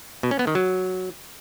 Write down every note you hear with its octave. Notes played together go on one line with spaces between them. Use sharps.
B2
C#4
B3
D#3
F#3